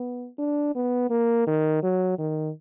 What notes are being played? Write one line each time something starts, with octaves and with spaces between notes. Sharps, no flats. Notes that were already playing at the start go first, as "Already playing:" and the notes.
Already playing: B3
D4
B3
A#3
D#3
F#3
D#3